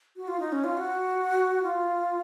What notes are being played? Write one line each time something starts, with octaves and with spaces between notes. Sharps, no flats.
F#4
F4
D#4
C#4
F4
F#4
F4